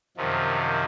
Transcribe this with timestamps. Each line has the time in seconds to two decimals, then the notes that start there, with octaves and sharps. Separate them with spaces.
0.17 F#2 C3 D#3 F3